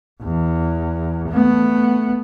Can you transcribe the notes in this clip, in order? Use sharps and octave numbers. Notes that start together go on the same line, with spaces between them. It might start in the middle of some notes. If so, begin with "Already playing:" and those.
E2
A3 B3